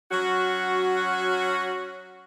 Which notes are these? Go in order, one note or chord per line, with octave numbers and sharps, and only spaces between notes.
F#3 C#4 F#4